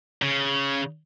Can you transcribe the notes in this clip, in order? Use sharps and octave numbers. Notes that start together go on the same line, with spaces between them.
C#3